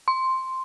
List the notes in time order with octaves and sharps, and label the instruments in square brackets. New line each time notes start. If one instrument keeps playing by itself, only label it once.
[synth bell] C6